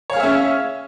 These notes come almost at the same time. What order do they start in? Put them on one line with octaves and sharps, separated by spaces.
C#5 F5 G#4 E5 C#4